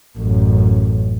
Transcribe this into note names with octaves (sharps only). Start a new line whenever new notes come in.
A1 F#2